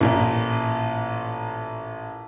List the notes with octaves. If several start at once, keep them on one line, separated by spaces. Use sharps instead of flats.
A1 A#2